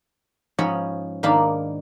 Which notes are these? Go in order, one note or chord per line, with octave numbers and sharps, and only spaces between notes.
G#2 F3 C#4 C#5 D#5 B5
G#2 D#3 A#3 D4 F5 B5